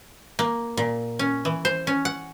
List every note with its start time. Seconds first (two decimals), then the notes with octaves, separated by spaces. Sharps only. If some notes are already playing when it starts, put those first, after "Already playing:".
0.39 A#3
0.77 A#2
1.19 C#4
1.45 E3
1.65 C5
1.87 C#4
2.05 F#5